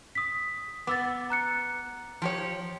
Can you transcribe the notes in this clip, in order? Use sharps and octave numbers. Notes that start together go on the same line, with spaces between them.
D#6 B6
B3 D6 E6 A6
A#5 F#6 C#7
F3 G4 C#5